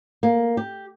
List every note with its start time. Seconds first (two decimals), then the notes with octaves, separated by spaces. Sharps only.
0.23 A#3
0.57 G4